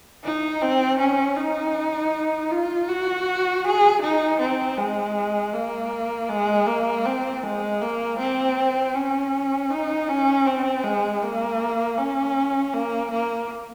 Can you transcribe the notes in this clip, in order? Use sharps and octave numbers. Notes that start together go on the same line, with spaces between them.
D#4
C4
C#4
D#4
F4
F#4
G#4
D#4
C4
G#3
A#3
G#3
A#3
C4
G#3
A#3
C4
C#4
D#4
C#4
C4
G#3
A#3
C#4
A#3
A#3